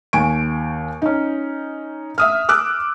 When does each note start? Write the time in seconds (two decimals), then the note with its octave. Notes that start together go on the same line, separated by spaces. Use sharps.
0.13 D#2 G#5 C#6 D7
1.02 C#4 D#4
2.18 E5 D#6 F6
2.49 D6 E6 F#6